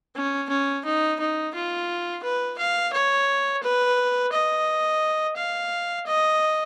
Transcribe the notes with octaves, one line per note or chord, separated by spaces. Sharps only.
C#4
C#4
D#4
D#4
F4
B4
F5
C#5
B4
D#5
F5
D#5